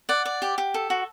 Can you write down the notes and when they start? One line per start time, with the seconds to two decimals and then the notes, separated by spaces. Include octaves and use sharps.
0.09 D5 F#5
0.25 D5
0.42 G4
0.58 G4
0.74 A4
0.90 F#4